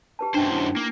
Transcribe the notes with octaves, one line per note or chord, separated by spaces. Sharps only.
G4 B4 A5
F#2 D4 D#4 C5 G5
E4
A#3